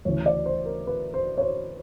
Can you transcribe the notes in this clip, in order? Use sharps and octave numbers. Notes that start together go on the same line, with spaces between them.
D2 C#3 E3 C#5
D5
C5
A#4
B4
C5
C#5
C5